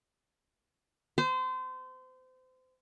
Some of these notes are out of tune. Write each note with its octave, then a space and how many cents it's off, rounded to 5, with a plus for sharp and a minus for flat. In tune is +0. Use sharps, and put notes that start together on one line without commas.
C5 -30